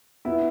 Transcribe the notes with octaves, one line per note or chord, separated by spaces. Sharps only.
B3 E4